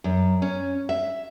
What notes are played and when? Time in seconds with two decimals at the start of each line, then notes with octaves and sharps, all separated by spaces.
0.04 F#2
0.42 C#4
0.89 E5